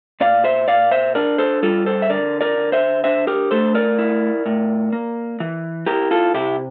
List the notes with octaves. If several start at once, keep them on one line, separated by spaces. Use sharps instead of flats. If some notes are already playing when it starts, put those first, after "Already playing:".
A#2 D5 F5
C5 E5
A#2 D5 F5
C5 E5
D4 A#4 D5
A4 C5
G3 F4 A4
A4 C5
E5
D3 A#4 D5
A#4 D5
D3
C5 E5
D4 C5 E5
G4 A#4
A3 A4 C5
A#4 D5
E4
A2
A#3
E3
E4 G4 A#4
F4 A4
C3 E4 G4